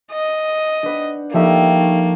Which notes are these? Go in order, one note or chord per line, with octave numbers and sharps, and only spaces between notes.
D#5
D4 B4 C5 F#5
F3 G3 A3 A#3 D4 D#4 E5